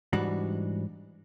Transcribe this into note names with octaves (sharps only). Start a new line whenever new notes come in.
G#2 E3 G3 D4 F#4